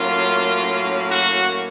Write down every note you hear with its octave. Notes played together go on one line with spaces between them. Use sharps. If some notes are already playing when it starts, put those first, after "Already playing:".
Already playing: A2 F#3 A#3 C#4 F4
F#4